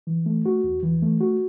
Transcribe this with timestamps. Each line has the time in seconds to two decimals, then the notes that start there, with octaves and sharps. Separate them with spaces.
0.07 E3
0.26 A3
0.46 F#4
0.64 E2
0.83 E3
1.02 A3
1.21 F#4